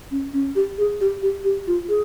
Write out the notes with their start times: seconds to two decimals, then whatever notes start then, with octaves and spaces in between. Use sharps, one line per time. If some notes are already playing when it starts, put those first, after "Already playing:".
0.11 C#4
0.33 C#4
0.56 G4
0.78 G#4
1.01 G4
1.23 G4
1.44 G4
1.67 F4
1.89 G#4